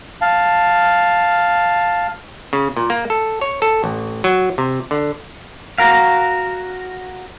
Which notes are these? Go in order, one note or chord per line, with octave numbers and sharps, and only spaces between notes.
F5 A5
C#3
A#2
A#3
A4
C#5
A4
A1
F#3
C3
D3
F#4 A#4 F5